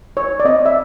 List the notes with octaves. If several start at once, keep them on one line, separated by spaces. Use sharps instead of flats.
D#4 C#5
D5
C4 D#5
E5